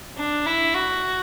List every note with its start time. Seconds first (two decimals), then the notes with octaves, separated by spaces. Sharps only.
0.18 D4
0.46 E4
0.74 F#4